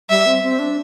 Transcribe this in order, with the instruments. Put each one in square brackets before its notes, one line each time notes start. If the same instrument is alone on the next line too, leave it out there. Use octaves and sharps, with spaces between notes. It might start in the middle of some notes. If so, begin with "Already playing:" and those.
[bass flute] G3 [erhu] E5
[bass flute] C4
C4
D4